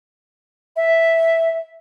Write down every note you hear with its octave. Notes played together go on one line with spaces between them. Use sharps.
E5